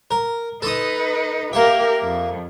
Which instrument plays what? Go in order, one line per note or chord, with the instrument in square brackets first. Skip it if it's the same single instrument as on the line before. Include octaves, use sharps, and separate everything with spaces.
[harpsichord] A#4
[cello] D#4 B4 [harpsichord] A4 C6 D#6
[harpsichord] A#3 E5 [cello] G4 A#4
[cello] F2